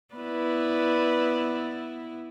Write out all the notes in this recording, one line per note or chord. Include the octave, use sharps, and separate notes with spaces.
B3 E4 B4 D5